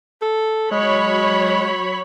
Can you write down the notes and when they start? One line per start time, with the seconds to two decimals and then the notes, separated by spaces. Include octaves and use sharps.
0.22 A4
0.72 F#3 G#3 C#5 B5